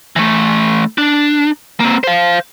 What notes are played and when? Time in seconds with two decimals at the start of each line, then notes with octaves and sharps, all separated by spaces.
0.16 E3 A3
0.98 D4
1.80 A#3 C4
2.04 C5 F5